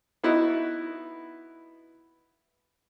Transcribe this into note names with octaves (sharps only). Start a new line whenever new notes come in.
B3 D#4 E4 F#4 B4